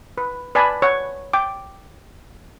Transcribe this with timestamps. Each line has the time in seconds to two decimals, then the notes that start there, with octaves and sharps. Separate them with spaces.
0.18 B4
0.55 B4 D5 G#5 A5 B5
0.82 C#5 F#5
1.33 G5 D6